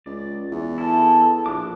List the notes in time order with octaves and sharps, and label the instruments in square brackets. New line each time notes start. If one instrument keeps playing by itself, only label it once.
[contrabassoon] C#2 [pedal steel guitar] D5
[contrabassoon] E2
[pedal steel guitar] E4 A4
[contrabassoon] A#1 [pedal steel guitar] D6 F#6